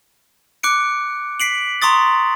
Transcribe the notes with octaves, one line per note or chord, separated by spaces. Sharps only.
D6 F#6 C#7 D7
B6 C7 D7 F#7
A#5 C6 C#6 D#6 A6